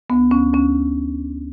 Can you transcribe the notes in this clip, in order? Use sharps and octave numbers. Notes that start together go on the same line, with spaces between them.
D2 B3
D2 C#4
D2 C#4